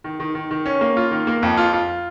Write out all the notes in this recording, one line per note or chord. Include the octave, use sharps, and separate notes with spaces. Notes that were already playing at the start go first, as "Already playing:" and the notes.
D#3
D#3
D#3
D#3
C#4
A#3
F4
D#3
A#3
F2
F4
F4